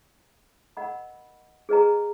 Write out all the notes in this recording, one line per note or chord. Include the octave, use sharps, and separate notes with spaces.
A#4 D#5 F#5 B5
G#4 B4 D#5 A#5